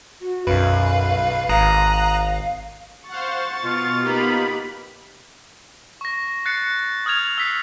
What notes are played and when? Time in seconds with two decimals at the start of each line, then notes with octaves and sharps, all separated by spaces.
0.22 F#4
0.47 B1 F#2 B4 F5
1.49 G#1 A#5 D#6 F#6
1.95 F5
3.09 C5 F5 F#5 C#6 A6
3.62 B2 F4
4.04 A#3 B3 D#4 G4 B5
6.01 C#6 A#6
6.46 F#6 A6 C7 C#7
7.06 D#6 F6 G#6 F7
7.38 E6 B6 C7